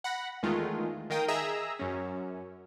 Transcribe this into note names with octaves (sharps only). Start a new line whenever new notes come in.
F#5 B5 A#6
E2 D#3 G#3 A3 F4
D#3 A#4 F5 G5 D#6
G#4 D#5 E5 A#5 E6
F#2 C#4